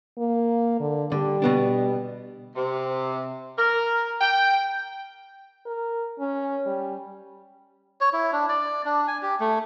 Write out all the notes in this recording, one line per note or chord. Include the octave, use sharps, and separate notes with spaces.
A#3
D3
D3 G3
B2 B3 D4
C3
A#4
G5
A#4
C#4
G3
C#5
E4
D4
D5
D4
G#5
G4
A3